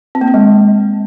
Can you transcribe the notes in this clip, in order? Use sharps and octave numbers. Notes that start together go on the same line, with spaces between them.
C4
A#3
C4
G#3